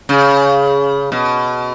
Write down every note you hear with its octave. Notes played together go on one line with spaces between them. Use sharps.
C#3
B2